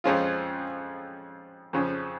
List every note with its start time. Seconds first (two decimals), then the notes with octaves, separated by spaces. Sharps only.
0.04 F2 F3 G#3 C#4 F4
1.73 F2 C#3 F3